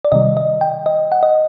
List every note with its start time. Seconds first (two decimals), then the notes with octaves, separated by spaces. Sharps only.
0.05 D5
0.12 C3 D#3 G3 D#5
0.37 D#5
0.61 G5
0.86 D#5
1.12 F#5
1.23 D#5